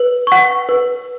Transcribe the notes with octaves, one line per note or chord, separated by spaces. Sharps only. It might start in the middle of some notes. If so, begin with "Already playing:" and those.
Already playing: B4
F#5 C#6
B4